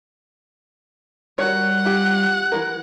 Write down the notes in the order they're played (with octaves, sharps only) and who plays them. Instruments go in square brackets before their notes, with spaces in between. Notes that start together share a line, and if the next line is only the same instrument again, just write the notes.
[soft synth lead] G3 [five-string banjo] F#4 A#4 C#5 [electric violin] F#5
[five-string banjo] F4 G4
E3 A#3 A#4